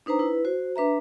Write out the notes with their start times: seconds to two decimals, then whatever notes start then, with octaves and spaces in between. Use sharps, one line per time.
0.06 D4 D#4 B4 C5 A#5
0.19 E4 B4
0.45 F#4 C5
0.76 D4 B4 E5 A#5